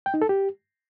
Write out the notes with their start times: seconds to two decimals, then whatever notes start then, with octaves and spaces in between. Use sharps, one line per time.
0.06 G5
0.14 D#4
0.22 A4
0.29 G4